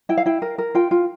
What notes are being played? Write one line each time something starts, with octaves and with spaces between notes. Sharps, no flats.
E4 G5
F5
E4 G5
A#4
A#4
F4 G5
F4